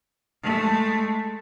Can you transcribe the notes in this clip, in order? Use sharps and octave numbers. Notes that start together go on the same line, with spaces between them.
G#3 A3